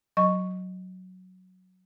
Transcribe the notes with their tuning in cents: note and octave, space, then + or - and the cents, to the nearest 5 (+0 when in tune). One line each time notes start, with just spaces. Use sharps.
F#3 +0 D#5 -5 C#6 +0